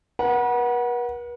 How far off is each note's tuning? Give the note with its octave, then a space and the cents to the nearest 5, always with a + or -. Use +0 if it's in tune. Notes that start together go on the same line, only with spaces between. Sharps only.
B4 -45 F#5 +0